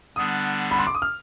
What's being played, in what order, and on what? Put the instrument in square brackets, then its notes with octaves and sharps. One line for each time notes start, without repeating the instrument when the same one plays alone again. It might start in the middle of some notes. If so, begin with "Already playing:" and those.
[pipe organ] D3 G3 B3 D4 [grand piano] D#6
[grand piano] B5
C6
D6
D#6
F6